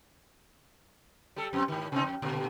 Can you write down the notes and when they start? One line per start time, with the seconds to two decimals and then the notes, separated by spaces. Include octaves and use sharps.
1.36 G3 A4
1.53 F2 C4
1.68 G#2 D#3
1.92 C3 C4 D#4
2.03 F2
2.22 G2 A#2 D3